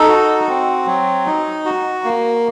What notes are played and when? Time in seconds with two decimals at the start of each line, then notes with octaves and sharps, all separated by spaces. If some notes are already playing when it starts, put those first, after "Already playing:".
Already playing: D#4 A4
0.08 F#4
0.48 C4
0.86 F#3
1.26 D#4
1.66 F#4
2.04 A#3